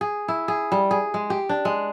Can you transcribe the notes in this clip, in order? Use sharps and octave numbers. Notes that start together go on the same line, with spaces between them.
G#4
E4
G#4
G3
G#4
G#3
G4
D4
G#3